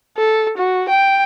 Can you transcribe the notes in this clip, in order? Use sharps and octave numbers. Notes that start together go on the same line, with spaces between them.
A4
F#4
G5